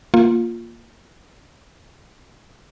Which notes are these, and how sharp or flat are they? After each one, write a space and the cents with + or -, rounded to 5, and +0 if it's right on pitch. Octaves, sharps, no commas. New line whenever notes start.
A#3 +0 F4 +0